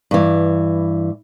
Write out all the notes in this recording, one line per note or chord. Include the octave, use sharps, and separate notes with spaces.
G2 E3